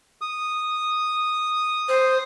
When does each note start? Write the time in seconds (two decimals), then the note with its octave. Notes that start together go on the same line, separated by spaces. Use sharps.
0.21 D#6
1.88 C5